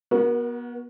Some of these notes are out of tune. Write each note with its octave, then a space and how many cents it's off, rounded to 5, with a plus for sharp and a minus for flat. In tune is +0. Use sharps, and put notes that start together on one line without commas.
B3 -30 F#4 +0 A#4 +30